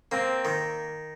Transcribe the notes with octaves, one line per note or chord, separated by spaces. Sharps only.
A#3 C4
D#3